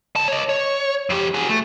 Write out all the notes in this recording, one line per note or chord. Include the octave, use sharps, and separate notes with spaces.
C#2 A5
C#5 D#5
C#5
F2 G4
F#4 G#4
A3